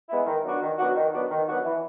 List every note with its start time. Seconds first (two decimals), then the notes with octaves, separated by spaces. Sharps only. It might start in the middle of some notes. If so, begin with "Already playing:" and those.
0.09 G#3 B3 E4
0.26 D#3
0.44 F#3 B3 D4 F#4
0.61 D#3
0.78 F#3 B3 D4 F#4
0.95 D#3
1.13 F#3 B3 D4 F#4
1.30 D#3
1.47 F#3 B3 D4 F#4
1.64 E3